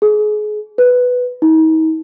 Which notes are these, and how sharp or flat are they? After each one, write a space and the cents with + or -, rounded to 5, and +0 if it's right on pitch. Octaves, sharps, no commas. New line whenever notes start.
G#4 +30
B4 +5
D#4 +40